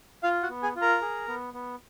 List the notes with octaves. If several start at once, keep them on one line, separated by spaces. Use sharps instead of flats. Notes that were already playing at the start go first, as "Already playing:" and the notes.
F4 F5
F#4 F#5
B3
G#4 G#5
F4
A#4 A#5
G#4
B3
B3